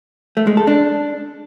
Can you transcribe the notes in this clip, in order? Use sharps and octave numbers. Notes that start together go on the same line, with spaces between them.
A3
G#3
A4
D4